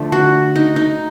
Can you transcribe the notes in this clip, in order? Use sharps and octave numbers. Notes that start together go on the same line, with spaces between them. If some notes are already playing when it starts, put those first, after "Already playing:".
Already playing: D3 F3 A3
F#4
D#4
D#4